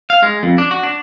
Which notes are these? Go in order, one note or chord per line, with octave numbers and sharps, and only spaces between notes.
F5
G#3
F2
D4
F#4
D4